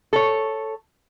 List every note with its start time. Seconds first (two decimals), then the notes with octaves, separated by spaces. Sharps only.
0.13 A4 C#5